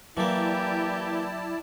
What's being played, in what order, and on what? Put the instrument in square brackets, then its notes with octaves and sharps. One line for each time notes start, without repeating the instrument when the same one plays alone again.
[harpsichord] E3 A#3 [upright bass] F#3 [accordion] E4 D5 A5 [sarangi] G4